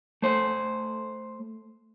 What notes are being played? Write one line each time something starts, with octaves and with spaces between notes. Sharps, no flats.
A3 C5